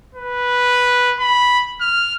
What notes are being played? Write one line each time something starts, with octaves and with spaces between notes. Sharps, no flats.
B4
B5
F6